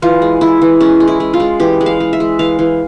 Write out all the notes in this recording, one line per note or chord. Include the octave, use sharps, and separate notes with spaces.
E3 F4
G#3
G#3 E4
E3
G#3 C#4
G#3
E4
G#3
F4
G#3
E3 G4
G#3
F5
G#3
E5
G#3
E3 F5
E3